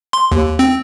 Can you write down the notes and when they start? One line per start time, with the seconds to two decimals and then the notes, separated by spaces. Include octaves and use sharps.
0.13 C6
0.32 D#2
0.59 C4